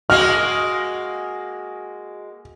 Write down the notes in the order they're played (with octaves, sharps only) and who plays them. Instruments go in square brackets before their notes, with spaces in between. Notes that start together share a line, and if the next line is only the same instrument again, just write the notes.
[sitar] G#3 A#3 F#4 [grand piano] F6